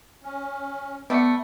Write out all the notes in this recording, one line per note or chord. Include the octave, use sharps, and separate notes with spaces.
C#4
G3 A3 B3 C#7